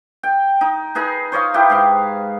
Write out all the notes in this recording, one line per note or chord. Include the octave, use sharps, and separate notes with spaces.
G5
D#4
D#4 G#4 B4
C5 C#5 D#5 F5
E4 G4 B4 G5
G#2 F5